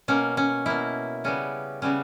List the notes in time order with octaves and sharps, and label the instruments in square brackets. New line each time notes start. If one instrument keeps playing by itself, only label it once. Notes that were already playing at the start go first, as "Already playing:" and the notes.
[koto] B2 A#3 C#4
C#4
B2 A#3 E4
C#3 G3 B3 C#4
C#3 G3 B3 C#4